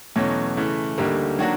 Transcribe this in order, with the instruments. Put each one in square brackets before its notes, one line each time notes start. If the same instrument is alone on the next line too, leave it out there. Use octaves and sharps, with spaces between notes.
[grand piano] E2 B2 F#3 A3 C#4
C#3 E3 A3
D2 D3 G3 A#3 D#4
D#3 F#3 A#3 D4 F#4